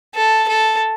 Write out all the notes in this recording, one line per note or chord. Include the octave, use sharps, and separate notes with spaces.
A4
A4